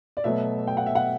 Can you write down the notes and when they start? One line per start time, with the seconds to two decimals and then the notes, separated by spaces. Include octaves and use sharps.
0.17 D5
0.24 B2 F#3 A3 E5
0.67 G5
0.77 F#5
0.86 E5
0.95 F#5